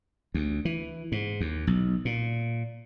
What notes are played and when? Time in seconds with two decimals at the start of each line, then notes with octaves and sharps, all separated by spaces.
0.34 D2
0.65 E3
1.12 G#2
1.41 D#2
1.67 B1
2.05 A#2